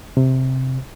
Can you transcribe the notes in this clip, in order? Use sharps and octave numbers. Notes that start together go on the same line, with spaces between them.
C3